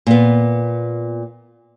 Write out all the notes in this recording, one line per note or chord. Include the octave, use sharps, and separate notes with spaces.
A#2 B3